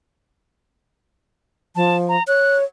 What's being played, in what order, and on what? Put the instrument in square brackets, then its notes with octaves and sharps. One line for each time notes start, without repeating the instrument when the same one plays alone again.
[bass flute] F3 [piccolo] A5
[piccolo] A#5
[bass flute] C#5 [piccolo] F#6